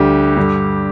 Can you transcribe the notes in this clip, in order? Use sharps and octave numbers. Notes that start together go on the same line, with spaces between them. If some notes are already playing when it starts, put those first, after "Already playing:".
Already playing: D2 D3 G3 G4
G2 D3 G3